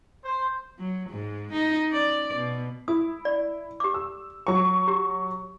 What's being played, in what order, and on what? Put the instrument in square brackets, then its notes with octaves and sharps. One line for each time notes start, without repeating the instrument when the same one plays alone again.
[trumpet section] C5
[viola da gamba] F#3
G#2
D#4
C#4 D5
B2
[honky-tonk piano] E4 [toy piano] D#6
[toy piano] D5
G4 D6
[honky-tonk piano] E6
F#3 C#6
[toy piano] G4